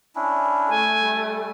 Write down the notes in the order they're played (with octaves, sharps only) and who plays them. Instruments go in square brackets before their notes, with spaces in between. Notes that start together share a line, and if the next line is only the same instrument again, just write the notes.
[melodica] C#4 D4 E4
[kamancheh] A3 [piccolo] G#5
[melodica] G3